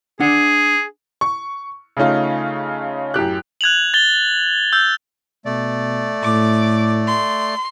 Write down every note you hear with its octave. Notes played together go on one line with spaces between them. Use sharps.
D4 G#4 F#5
C#6
C#3 A3 C#4 D#4 F4
F#2 A2 G4 F#6
F#6 G#6 F7 F#7
A6 G7
E6 G6
B2 A3 D5
A2 D6
C6